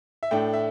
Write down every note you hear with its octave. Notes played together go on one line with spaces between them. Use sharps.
E5
A2 A3 D4 G5
E5